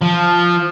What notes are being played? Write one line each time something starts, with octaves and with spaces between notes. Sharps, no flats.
F3